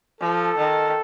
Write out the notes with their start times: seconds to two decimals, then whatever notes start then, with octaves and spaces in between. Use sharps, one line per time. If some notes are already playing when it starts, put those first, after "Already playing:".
0.21 F3 A4
0.57 D#3